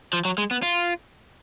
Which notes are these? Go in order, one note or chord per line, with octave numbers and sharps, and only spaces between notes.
F3
F#3
G#3
B3
F4